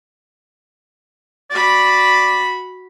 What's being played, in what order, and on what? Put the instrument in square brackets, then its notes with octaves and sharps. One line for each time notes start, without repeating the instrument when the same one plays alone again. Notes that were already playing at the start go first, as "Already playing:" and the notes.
[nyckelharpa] F#4 B5 [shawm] D5